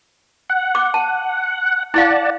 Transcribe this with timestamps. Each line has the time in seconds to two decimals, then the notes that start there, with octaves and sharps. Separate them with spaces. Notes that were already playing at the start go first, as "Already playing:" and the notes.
0.50 F#5
0.75 D6
0.94 A5
1.94 E4 D5 F5 F#5 A5